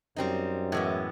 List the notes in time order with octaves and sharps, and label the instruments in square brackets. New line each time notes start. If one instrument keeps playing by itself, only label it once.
[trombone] F#2 [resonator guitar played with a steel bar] G3 C4 D#4
[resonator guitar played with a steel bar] A2 E3 G#3 B3